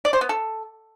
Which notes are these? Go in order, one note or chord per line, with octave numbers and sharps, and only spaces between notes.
D5
C5
B3
A4